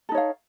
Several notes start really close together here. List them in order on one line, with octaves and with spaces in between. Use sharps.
A4 D#4 C#5 F5